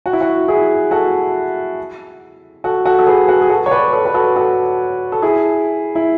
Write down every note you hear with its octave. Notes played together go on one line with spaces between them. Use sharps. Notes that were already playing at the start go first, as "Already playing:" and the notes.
F#4
E4
F#4
E4 G#4
F#4 A4
F#4 A4
F#4 A4
A4
G#4 B4
F#4
G#4
F#4 A4
C#5
B4 D5
A4 C#5
B4
F#4 A4
F#4 A4
A4
E4 G#4
E4